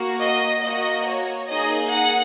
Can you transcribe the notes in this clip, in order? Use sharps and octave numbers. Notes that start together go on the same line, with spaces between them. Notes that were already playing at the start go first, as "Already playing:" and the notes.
Already playing: A#3 F#4
D#5
A#3 F#4 D#5
C#5
A#3 D#4 G#4 D#5
F#5